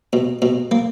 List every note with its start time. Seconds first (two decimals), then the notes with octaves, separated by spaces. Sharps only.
0.13 B2
0.42 B2
0.71 A#3